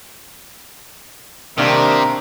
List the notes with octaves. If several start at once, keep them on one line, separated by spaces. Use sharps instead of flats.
C3 D#3 G3 A#3 D4 E5 A#5